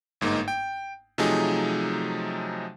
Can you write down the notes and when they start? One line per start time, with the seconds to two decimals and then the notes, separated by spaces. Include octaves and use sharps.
0.21 G1 G#2 A#3 D#4
0.48 G5
1.18 C3 F3 F#3 A3 D#4 G#4